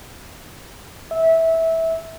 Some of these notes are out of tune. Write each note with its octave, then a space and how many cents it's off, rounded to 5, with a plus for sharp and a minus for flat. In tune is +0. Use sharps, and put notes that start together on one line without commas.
E5 -15